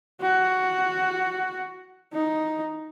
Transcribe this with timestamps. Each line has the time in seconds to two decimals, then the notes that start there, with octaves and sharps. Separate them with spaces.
0.21 F#4
2.14 D#4